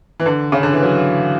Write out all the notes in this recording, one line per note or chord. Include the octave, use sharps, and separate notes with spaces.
E3
D3
C#3
D3
E3
F#3